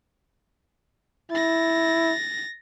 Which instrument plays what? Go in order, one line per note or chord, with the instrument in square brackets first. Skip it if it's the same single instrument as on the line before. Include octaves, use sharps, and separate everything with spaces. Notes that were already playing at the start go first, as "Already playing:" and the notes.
[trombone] E4 [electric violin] A6 A#6